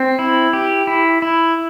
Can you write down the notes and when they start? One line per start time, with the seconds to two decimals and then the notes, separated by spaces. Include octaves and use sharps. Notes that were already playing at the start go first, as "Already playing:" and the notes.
Already playing: C4
0.19 E4
0.53 G4
0.87 E4
1.22 E4